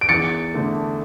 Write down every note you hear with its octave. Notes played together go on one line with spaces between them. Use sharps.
D7
E2 A6 C#7
D3 A3